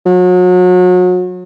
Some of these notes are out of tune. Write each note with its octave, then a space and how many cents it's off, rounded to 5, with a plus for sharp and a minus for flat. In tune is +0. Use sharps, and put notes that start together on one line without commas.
F#3 -35